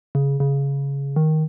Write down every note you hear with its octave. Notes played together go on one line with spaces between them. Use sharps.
C#3
C#3
D#3